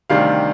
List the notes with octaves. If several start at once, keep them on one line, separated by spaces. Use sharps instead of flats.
D2 C3 D#3 G3 D4 F5